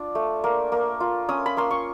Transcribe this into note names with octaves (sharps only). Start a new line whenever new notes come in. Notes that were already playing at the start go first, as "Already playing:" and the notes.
Already playing: D4 F4
A3
A#3
A#3
F4
C#4 D#6
B5
A#3 C6
C#6